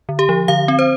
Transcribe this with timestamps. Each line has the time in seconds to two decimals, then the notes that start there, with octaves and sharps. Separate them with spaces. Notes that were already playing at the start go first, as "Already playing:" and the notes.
0.09 D3
0.19 G4
0.29 F3
0.48 D3 F5
0.68 C4
0.79 C5